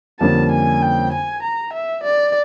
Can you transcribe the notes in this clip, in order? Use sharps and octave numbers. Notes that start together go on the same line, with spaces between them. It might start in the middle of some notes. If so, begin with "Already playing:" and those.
F2 D3 G3 A#3 C#4 A5
G#5
G5
G#5
A#5
E5
D5